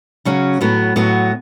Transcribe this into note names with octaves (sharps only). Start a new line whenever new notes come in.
C#3 F#3 C#4 F#4
A2 F#3 B3 F#4
A2 F#3 B3 F#4